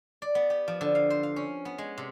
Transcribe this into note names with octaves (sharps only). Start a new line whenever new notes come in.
D5
B3
G4
F3
D3
F5
C5
F5
C#4
B3
G#3
C3